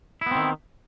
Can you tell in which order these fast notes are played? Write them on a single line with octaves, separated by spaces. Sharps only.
E4 B3 C4 D#3